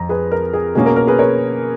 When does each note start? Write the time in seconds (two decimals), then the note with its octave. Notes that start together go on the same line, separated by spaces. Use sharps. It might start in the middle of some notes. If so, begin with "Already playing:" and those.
Already playing: F2 A#5
0.09 G#4 B4
0.32 A#4
0.53 G#4
0.75 B2 A#3 C#4 G#4
0.86 A#4
0.96 A#4
1.07 G#4 B4
1.19 A#4 C#5